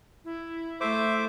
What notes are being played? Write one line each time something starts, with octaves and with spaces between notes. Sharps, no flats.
E4
A3 C5 E5 D6